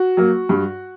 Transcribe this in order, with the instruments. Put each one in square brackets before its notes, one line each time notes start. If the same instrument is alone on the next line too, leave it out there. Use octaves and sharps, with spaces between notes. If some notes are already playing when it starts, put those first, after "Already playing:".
Already playing: [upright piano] F#4
F#3 A#3
G2